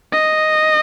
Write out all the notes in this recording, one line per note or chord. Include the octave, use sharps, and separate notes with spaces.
D#5